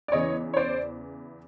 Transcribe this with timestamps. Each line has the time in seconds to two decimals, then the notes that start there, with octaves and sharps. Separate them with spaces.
0.08 D5
0.12 E2 C#3 E3 C#5 D#5
0.54 C#5
0.57 C5 D5